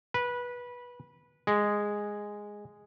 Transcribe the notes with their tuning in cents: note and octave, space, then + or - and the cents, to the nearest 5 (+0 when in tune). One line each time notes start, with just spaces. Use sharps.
B4 -20
G#3 -5